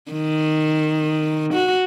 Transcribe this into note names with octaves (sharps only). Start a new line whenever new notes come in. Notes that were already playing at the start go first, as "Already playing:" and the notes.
D#3
F#4